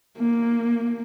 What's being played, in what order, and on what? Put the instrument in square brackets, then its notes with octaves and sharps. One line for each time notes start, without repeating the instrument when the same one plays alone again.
[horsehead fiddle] A#3